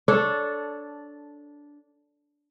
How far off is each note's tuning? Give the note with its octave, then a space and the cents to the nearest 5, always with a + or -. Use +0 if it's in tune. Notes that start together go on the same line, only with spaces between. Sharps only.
D4 -10 A4 +0 C#5 +0